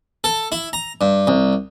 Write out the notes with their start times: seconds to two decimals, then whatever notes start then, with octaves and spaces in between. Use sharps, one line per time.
0.24 A4
0.52 E4
0.73 A#5
1.01 G2
1.27 C2